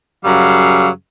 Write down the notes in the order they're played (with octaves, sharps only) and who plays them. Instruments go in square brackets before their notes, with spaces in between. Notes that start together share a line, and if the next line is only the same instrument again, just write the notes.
[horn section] F#2 C#3 F#3 G3 F5